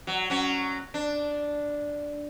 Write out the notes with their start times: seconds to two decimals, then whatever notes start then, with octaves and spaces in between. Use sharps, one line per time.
0.07 F#3
0.30 F#3 C#4
0.94 D4